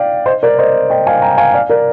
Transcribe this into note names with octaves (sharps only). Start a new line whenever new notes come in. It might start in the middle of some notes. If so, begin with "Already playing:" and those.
Already playing: D5 F5 G5
C5 D#5
A#4 D5
C5 D#5
D#5 G5
F5 G#5
G5 A#5
F5 G#5
D5 F5
A#4 D5